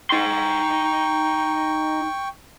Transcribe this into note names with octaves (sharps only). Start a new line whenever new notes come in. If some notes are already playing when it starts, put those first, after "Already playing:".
D#4 G5 C6 C#6